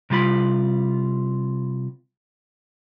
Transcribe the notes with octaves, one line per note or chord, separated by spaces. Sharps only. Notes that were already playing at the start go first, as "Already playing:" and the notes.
C3 G3 F4 B5